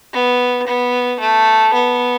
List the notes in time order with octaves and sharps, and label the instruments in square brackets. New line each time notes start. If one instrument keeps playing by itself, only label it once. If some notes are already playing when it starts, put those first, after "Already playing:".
[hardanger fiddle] B3
B3
A3
B3